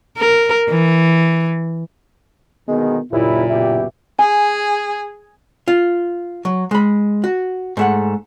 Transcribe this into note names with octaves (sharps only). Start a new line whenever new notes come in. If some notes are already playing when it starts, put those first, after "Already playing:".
A#4
E3
B2 D3 D#3 G#3 B3
F#1 D#2 A#2 E4
B2 E4 G4
G#4 G#5
F4
F#3
G#3 B5
F#4
G#2 A3 F#5